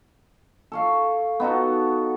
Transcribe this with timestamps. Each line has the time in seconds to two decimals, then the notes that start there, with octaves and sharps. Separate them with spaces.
0.72 A4 C#5 F5
1.40 B3 D#4 F#4 A4